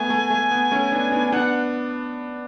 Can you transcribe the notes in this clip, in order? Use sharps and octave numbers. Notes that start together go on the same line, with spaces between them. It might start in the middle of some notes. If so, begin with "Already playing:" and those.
Already playing: A3 B3 G#5
A3
A3
B3
A3 C#4
B3 D4
B3 D4
B3 D4 F#5